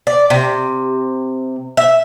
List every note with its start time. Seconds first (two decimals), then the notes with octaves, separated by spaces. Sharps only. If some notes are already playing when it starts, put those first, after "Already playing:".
0.07 D5
0.30 C3
1.77 E5